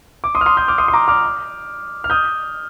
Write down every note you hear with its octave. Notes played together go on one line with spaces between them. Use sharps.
D6
C6 D#6
F6
C6 D#6
D#6 G6
D6 F6
C6 D#6
C6
A#5 D6
D6 F6
F6
D#6 G6